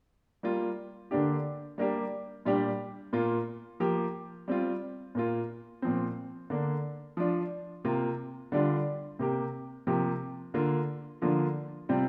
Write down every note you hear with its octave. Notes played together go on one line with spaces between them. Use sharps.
G3 A#3 F4
D3 A#3 D4 G4
G3 A#3 D4 G4
A#2 G3 D4 G4
A#2 A#3 F4
F3 A#3 G4
G3 C4 F4
A#2 A#3 F4
A#2 F3 C4
D3 A#3 D4
F3 D4 F4
C3 A#3 F4
D3 G3 D4 F4
C3 A#3 G4
C3 F3 A#3 G4
D3 A#3 F4
D3 F3 A#3 D4 F4
C3 G3 C4 F4